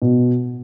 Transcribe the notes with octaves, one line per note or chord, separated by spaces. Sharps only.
B2